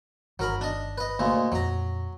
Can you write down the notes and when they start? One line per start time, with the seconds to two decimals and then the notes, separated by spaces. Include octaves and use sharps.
0.39 G1 D#3 F#3 A#4 B5
0.61 D4 D#5
0.98 B4 D#5
1.19 D2 A#2 G#3
1.52 F2 A#2 F#3 A#5